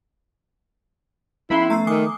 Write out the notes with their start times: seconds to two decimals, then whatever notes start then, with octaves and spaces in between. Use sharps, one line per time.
1.50 F3 B3 C#4 E4 B5 C6
1.70 A3 A#5 E6 C7
1.87 D#3 G#5 D6 D#6